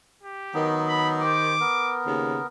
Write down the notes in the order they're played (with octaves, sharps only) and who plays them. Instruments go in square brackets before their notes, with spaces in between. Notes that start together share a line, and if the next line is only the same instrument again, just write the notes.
[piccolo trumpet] G4
[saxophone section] D#3 [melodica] F#3 B3
[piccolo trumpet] B5
[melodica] G4 C5 [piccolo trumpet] D6
[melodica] B3 A#4
[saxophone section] D#2 C#3